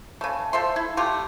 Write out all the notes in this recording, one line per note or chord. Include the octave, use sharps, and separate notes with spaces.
C#3 A3
F3 A4 E5 C6
E4
A3 F4 G4